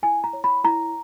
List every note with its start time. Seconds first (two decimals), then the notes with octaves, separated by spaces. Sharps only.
0.03 E4 G#5
0.24 A#5
0.33 C#5
0.44 B5
0.64 E4 A#5